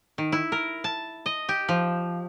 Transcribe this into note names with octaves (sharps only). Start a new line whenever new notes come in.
D#3
E4
A#4
A5
D#5
G4
F3